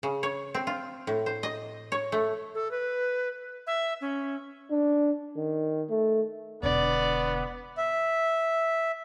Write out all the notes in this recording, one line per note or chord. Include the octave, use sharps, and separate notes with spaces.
C#3
C#5
C4
F4
A2
C5
D#5
C#5
A3
A4
B4
E5
C#4
D4
D#3
A3
E1 D3 B3 D5
E5